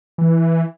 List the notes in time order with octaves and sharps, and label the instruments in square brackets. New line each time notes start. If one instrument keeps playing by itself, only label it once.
[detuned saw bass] E3